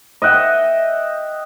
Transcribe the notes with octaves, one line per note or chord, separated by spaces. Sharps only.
D#5 E5 F#5 G5